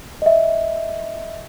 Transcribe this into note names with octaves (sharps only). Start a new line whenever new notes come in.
D#5 E5